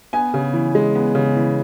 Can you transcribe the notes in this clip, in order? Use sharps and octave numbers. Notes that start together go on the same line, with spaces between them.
B3 G#5
C#3
E3
G#3
B3
C#3
E3